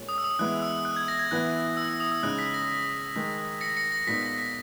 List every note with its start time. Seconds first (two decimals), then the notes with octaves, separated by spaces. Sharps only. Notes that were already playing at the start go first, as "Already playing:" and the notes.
Already playing: A#2 G#3 C#4
0.09 D#6
0.18 E6
0.24 D#6
0.39 E3 G#3 B3 E4 F#6
0.62 E6
0.85 F#6
0.96 G#6
1.08 A#6
1.19 G#6
1.31 E3 B3 E4 F#6
1.77 E6
1.89 E6
2.00 D#6
2.12 E6
2.23 C#3 G#3 D#4 F#6
2.39 B6
2.54 A#6
3.16 D#3 G#3 D#4
3.61 A#6 C#7
3.77 A#6 C#7
3.92 A#6 C#7
4.07 A#2 G#3 B3 D#4 B6
4.23 A#6
4.38 B6